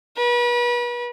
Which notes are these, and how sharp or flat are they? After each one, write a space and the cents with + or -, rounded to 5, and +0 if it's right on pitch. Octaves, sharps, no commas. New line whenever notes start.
B4 -35